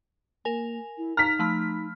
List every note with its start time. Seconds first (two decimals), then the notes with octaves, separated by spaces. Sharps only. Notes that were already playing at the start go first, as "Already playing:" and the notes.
0.45 A#3 A#4 G#5
0.98 E4
1.17 D#4 A#5 F6 B6
1.39 F3 A3 B5